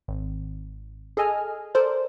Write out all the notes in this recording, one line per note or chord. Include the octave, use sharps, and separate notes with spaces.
G#1
G#4 A4 D#5 G#5 F6
A4 A#4 C5 D5